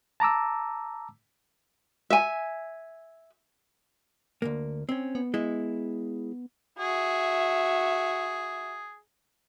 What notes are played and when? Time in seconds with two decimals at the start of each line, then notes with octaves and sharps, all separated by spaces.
0.20 A5 A#5 D6 E6
2.10 E5 G#5
4.42 D2 G2 A#3
4.89 C4 C#4
5.15 B3
5.34 G#3 E4
6.79 F#4 G#4 E5